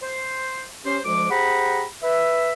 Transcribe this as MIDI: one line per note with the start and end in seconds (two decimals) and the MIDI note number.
0.02 0.67 72
0.85 0.98 61
0.85 0.98 67
0.85 0.98 72
1.04 1.27 38
1.04 1.27 53
1.04 1.27 56
1.04 1.27 72
1.04 1.27 86
1.30 1.84 67
1.30 1.84 68
1.30 1.84 72
1.30 1.84 78
1.30 1.84 82
1.30 1.84 83
2.02 2.52 71
2.02 2.52 76